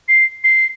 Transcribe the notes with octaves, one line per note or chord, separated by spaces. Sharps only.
C7
C7